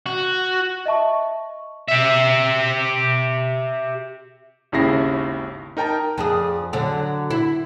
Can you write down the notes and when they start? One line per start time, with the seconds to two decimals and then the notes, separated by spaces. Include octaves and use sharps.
0.06 F#4
0.86 D#5 E5 A5 C#6
1.88 G4 E5
4.72 G#1 D#2 C#3 E4 A#6 C7
5.77 D#4 A#4 G5 A5 A#5
6.18 F2 D4 G#4
6.73 D3 F#3 D4
7.30 E4